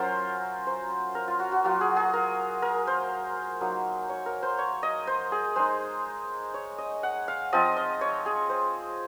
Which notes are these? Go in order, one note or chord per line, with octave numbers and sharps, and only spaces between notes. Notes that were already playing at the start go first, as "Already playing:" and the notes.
Already playing: F#3 C#4 F4 A#4 C5
C5
A#4
F4
F#4
F#4
F#3 A#3 F4 F#4
G#4
G#4
A#4
A#4
C5
F#3 A#3 D#4
C#5
A#4
C5
C#5
D#5
C5
G#4
G#3 D#4 C5
C#5
D#5
F#5
F5
F3 C4 F4 D#5
D#5
C#5
G#4
C5